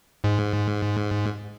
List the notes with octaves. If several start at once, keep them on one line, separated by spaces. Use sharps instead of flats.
G#2